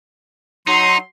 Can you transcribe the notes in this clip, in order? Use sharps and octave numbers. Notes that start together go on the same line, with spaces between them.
F#3 D#4 C6